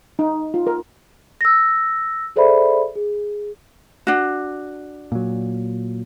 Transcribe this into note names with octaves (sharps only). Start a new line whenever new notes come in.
D#4
F4
A#4
E6 A#6
G#4 A4 C5 D5 E5 B5
G#4
D4 F#4
A#2 F#3